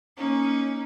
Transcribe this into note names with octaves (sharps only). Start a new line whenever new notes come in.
A#3 C#4 D#4